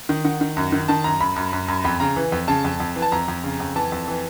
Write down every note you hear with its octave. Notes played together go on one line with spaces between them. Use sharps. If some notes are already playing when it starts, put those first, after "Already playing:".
D#3
D#3 F#5
D#3
F#2
D#3
D#3 A5
F#2 A#5
F#2 B5
F#2
F#2
F#2
F2 B5
C#3 A#5
E3
F2
C#3 A5
F2
F2
E3
A5
F2 A#5
F2
C#3
F2
E3 A5
F2
E3